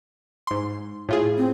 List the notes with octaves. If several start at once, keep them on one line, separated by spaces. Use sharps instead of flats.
G#2 C6
A2 F4 G#4
C4